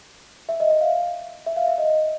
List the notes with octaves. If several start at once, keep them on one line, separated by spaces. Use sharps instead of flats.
E5
D#5
E5
F5
E5
F5
E5
D#5